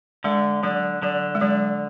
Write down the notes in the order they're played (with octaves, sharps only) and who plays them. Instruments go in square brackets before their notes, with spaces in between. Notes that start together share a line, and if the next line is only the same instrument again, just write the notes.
[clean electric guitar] D3 [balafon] G#3
[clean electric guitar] D3 [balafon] F#3
[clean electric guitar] D3 [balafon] F#3
[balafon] G#3
[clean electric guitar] D3 [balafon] F#3